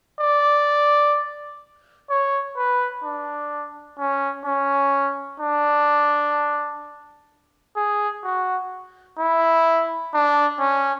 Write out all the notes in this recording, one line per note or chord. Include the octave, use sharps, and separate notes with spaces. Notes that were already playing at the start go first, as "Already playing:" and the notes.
D5
C#5
B4
D4
C#4
C#4
D4
G#4
F#4
E4
D4
C#4